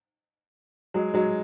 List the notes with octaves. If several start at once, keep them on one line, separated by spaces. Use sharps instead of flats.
F#3 G#3
F#3 G#3